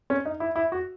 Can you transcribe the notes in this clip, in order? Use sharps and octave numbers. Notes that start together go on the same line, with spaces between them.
C#4
D#4
E4
E4
F#4